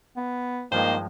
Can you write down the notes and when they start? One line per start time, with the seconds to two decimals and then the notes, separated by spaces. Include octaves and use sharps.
0.16 B3
0.72 G2 D#3 F3 G#3 A#3 C5